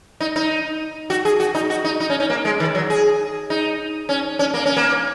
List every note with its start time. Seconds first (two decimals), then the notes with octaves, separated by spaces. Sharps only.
0.20 D#4
0.36 D#4
1.10 F#4
1.25 G#4
1.40 F#4
1.55 D#4
1.70 F#4
1.85 D#4
2.00 D#4
2.10 C#4
2.20 C#4
2.30 A#3
2.45 G#3
2.60 D#3
2.75 F#3
2.90 G#4
3.50 D#4
4.09 C#4
4.39 C#4
4.54 A#3
4.66 C#4
4.77 A#3